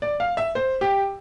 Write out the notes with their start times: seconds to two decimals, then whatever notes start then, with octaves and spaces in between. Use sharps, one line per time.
0.02 D5
0.20 F5
0.37 E5
0.55 C5
0.81 G4